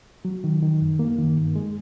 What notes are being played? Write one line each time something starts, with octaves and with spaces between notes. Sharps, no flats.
F#3
D#3
D#3
F#2
A#3
D#3
G2
G#3